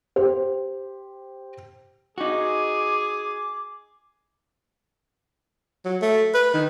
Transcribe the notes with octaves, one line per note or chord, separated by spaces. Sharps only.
G4 C5
D#4 F#4 G#4 D6
F#3
A3
B4
D#3